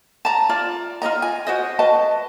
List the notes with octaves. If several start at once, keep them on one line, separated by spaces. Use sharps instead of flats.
A5 A#5
F4 D5
F4 F#4 D#5 A#5
G#5
F#4 C5 D#5
F#4 B4 D#5 A5